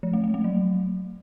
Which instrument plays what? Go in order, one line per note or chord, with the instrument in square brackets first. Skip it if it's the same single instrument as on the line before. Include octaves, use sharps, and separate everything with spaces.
[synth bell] F3
A3
A3
A3
F#3